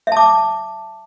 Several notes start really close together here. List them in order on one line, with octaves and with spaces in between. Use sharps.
E5 A5 D6